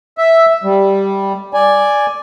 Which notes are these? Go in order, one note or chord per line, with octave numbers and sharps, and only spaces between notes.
E5
G3
D5 G#5